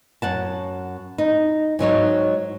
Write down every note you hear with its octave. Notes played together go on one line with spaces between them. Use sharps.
F#2 F#5 A5
D#4
G#2 F#3 D#4 C#5